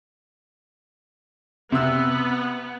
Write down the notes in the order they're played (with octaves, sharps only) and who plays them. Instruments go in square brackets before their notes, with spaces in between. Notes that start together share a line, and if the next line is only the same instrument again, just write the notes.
[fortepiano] C3 E6 [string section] B3